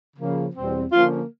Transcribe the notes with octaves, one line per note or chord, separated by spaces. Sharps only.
C#3 F3 A#3
E2 B2 G3 C4
D3 F3 A#3 C#4 F4